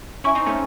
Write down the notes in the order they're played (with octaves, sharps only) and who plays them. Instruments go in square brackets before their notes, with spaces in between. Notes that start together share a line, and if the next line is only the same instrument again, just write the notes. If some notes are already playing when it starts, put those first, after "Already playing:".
[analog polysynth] C#4 E4 [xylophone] E5 G#5 C#6
[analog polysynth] C4 D#4
A3 C#4